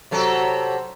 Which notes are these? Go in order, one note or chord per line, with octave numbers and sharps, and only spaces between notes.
C3 F#3 A4